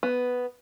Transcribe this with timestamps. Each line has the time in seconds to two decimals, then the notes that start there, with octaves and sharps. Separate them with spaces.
0.03 B3